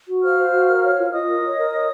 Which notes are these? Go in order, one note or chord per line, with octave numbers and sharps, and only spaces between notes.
F#4
C5 F5 F6
C5
F#4
A#4
C#5
F4
F4 D#5 D#6
A#4
C#5
A#4
C#5